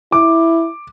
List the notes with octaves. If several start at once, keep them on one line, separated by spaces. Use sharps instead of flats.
E4 D6